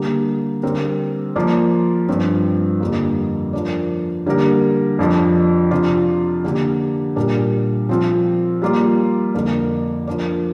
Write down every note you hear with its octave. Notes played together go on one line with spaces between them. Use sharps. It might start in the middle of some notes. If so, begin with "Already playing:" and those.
Already playing: D3 G3 A#3 G4
D3 G3 C4 A#4
F3 A#3 F4 D5
G2 F3 C4
F2 D3 G3 A#3
F3 D4 A#4 D5
D3 G3 A#3 G4 A#4
F2 F3 D4
C3 F3 D4 F4 D5
D3 A#3 D4 G4
A#2 G3 D4 A#4 D5
F3 C4 F4
G3 A#3 F4 D5
F2 D3 A#3 D4 A#4
F3 D4 A#4 D5